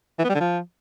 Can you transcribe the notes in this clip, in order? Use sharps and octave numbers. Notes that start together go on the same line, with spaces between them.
E3
B3
G3
D3
F3